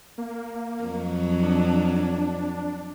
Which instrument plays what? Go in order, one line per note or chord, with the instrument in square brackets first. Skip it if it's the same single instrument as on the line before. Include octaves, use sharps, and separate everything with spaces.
[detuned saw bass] A#3
[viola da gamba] F2 F#3
[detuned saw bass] D4